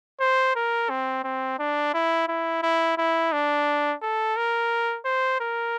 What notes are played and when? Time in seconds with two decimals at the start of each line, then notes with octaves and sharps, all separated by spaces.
0.20 C5
0.55 A#4
0.90 C4
1.24 C4
1.59 D4
1.94 E4
2.28 E4
2.63 E4
2.98 E4
3.33 D4
4.02 A4
4.37 A#4
5.05 C5
5.40 A#4